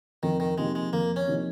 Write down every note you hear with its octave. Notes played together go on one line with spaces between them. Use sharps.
F2 D#3
D#3
C3 F3 G#3 A#3 D#4
G#3
F2 A#3
C#4
C3 F3 A#3 D#4